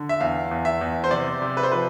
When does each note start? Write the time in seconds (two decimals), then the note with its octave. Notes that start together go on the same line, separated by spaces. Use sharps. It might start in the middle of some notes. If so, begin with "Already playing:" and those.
Already playing: D3
0.09 E5
0.20 E2 F5
0.51 E2
0.65 E5
0.81 E2
1.04 C5
1.11 C3 D5
1.42 C3
1.57 B4
1.63 C5
1.72 F3 B4